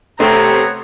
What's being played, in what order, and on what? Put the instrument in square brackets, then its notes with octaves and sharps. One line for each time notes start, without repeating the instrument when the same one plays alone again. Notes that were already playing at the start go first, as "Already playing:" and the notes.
[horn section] C3 C4 [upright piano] A3 [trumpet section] B3 C#5 [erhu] A#5